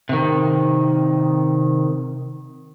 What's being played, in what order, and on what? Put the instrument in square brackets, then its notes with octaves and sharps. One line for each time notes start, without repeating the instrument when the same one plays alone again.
[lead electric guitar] C3 D#3